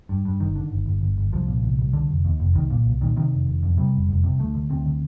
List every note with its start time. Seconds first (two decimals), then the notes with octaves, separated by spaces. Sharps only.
0.09 G2
0.25 G2
0.40 G1 D#3
0.55 D3
0.71 G1
0.86 G1
1.01 G1
1.18 G1
1.32 C2 F3
1.48 A#2
1.63 C2
1.79 C2
1.93 D3
2.09 F1
2.25 D#2
2.40 F1
2.55 C2 D#3
2.70 A#2
2.86 C2
3.01 A#2 D#3
3.16 C3 D#3
3.32 F1
3.47 F1
3.63 F2
3.77 C3 G3
3.93 F1
4.09 F1
4.24 C3
4.39 D2 A3
4.55 D3
4.70 D2 C4
4.86 D3